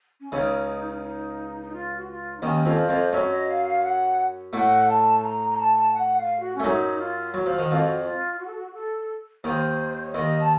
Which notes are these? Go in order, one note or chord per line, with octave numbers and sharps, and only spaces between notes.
C#4
C#2 C#3 D#4
D#4
D#4
F4
F#4
F4
D#4
D#2 D#3 C#4
F2 F3
C5
F2 F3
F#2 F#3 C#5
D#5
F5
F5
F#5
A2 A3 F#5
A5
A5
A#5
A#5
A5
F#5
F5
F#4
C#4
A3
F#2 F#3 D#4
F4
F#3 F#4
F3
D#3
F2 F3
F4
F#4
A4
F#4
F#4
A4
D#2 D#3 C5
C#5
D#2 D#3 D#5
A5